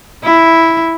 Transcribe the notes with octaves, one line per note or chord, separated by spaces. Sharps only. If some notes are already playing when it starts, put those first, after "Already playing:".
E4